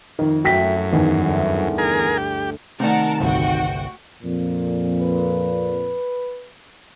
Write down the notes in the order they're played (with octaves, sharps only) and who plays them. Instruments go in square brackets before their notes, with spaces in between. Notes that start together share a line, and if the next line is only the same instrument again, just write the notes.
[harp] F2 [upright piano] D#3
[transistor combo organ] F#2 [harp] A3 E4 [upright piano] F#4 G5 B6
[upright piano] E2 D#3 [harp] G2 G#4 C7
[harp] D2
[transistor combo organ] G#4 A#4
G4
[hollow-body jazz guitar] C3 D#3 [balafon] A3 D5 [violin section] A#4 F#5 A5
[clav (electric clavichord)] G1 C2 [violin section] F#4 F#5 G5
[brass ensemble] F2 A#2
[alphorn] B4